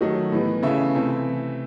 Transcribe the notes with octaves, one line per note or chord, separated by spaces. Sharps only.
D#3 F#3 A3 D#5
A2 E3 G3 B3
C#3 E3 A3 E5
C3 E3 A3 C4